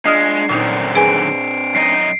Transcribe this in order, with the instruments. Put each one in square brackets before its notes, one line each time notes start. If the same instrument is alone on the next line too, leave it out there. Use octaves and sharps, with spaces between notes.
[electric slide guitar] G#3 [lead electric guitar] D4 F4 [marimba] D#5 D#6 F6 [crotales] C7
[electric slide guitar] F#2 D3 D#3 [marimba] A#2 D#4 [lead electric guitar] C4 D4
[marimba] G#4 B4 G#5 [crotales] D7
[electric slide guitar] F#2 D#4 D#5 [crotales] C7